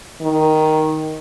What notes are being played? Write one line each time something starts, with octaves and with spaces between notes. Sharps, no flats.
D#3